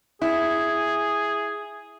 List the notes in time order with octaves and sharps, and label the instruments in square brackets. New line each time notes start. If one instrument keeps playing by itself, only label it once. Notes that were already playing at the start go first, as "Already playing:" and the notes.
[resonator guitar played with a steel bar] E4 [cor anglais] G#4